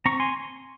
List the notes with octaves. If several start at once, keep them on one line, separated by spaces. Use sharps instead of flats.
C4 A#5 C#6
G#5 C6